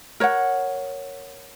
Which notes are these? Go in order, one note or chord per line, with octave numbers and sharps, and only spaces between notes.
A#4 C#5 F#5